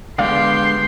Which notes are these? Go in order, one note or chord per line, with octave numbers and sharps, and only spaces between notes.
D3 G#3 B3 G4 D5 F5 G5 C6